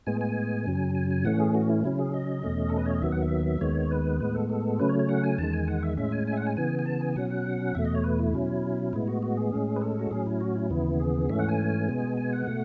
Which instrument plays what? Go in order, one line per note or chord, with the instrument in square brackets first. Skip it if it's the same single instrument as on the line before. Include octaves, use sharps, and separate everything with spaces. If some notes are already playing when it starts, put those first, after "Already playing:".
[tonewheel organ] A2 G#3 B3 G#5
G#5
F#2 C#3 F#3
G#5
G#5
A2 E3 A3 C#4 F#5
G#4
F#4
E4
C#3 F#3 C#4 E4
G#4
D#5
E2 B2 A3 C#4
A4
B4
C#5
D#5
D#2 D#3 F#3 B3 E5
F#5
E5
D#2 D#3 G#3 B3 C#5
B4
A2 G#3 B3 B4
A4
A4
C#3 F#3 A3 C#4 B4
C#5
C#5
F#5
G#5
E2 D#3 G#3 A5
G#5
F#5
E5
A2 G#3 C#4 E5
G#5
E5 G#5
F#5
G#5
C#3 E3 B3 G#5
G#5
A5
G#5
B2 F#3 C#4 F#5
F#5
E2 B2 A3 E5
D#5
C#5
B4
E4
B2 F#3 C#4
A2 G#3 B3 E4
F#4
F#4
G#4
A2 G#3 C#4
B4
A4
F#4
A2 F#3 C#4 G#4
E4
F#4
E4
D#2 C#3 E3 B3 E4
G#4
G#2 E3 A3 C#4 E5
F#5
G#5
B2 G#3 B3
G#5
F#5
B2 A3